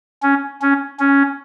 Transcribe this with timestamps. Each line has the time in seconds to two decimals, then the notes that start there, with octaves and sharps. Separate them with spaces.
0.23 C#4
0.62 C#4
0.99 C#4